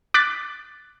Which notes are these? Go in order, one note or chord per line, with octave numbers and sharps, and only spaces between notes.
D6 F#6 A6 B6